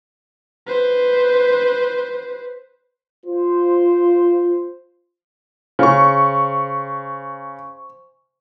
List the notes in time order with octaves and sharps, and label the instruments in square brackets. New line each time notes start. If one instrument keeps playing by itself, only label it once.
[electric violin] B4 C5
[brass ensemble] F4 C5
[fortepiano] C#3 [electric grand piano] C5 C#6